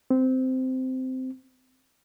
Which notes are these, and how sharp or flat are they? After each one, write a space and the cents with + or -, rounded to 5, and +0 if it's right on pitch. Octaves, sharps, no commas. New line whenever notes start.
C4 -15